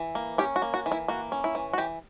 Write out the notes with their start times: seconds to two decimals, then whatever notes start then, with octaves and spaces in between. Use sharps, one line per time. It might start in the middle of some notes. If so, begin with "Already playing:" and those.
Already playing: E3
0.15 A#3
0.38 C#4 G4
0.56 F#4
0.62 A#3
0.74 F#4
0.86 E3
0.92 E4
1.08 A#3 F#4
1.32 C#4
1.44 E4
1.55 E3
1.73 F#4
1.78 E3 G4